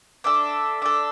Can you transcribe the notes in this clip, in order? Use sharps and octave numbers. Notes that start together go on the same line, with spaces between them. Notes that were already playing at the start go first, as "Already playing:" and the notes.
D4 A4 E5
D4 A4